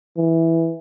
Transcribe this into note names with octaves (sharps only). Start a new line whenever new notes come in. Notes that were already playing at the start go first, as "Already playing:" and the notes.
E3